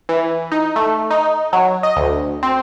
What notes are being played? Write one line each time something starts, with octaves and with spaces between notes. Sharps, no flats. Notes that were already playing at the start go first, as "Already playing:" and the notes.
E3
D#4
A3
D#4
F#3
D#5
D2
C4